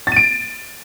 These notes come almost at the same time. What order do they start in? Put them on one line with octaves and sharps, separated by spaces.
A6 D#7 D7